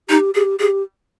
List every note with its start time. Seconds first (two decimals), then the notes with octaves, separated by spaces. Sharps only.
0.09 D#4 G4
0.35 G4 G#4
0.60 G4 G#4